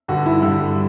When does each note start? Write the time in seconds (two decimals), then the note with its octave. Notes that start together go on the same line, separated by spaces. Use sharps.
0.08 G2 D3 G3 F#4
0.26 E4
0.42 G2 D3 G3